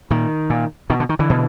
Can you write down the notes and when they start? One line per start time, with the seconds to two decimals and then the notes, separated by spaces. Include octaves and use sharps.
0.11 A#2 D#3
0.50 A#2
0.90 B2 D#3
1.00 D3
1.09 D#3
1.19 D3 E3
1.30 B2